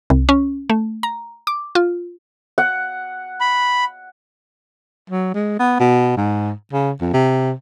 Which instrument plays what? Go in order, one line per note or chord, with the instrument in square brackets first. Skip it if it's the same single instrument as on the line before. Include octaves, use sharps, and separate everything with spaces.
[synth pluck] C2
C#4
A3
A#5
D6
F4
[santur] F#5
[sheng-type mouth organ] B5
[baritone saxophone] F#3
G#3
B3
B2
G#2
C#3
F2
C3